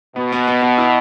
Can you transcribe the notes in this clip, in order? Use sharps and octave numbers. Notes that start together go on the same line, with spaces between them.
B2 B3
B3
B3
B3
E4